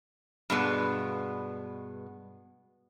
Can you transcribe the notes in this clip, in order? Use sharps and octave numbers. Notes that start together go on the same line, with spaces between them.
G2 B2 G#3 B3 D5